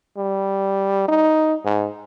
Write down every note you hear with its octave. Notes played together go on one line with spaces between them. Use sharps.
G3
D#4
G#2